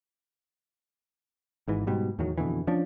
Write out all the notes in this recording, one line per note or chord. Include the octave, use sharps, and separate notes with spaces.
G#1 G#2 E3
G#2 B2 G3
E2 A2 D#3 F#3
F2 B2 D3 E3
F3 C#4 D4